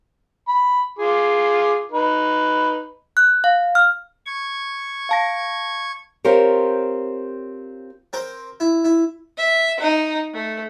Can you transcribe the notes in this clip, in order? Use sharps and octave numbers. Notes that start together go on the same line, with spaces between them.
B5
F4 G#4 D6
D#4 B4
F#6
F5
F6
C#6 G#6
F5 A5 A#6
C4 F4 G4 A#4 C5 C#5
C4 A#4 C5
E4
E4
E5
D#4
A3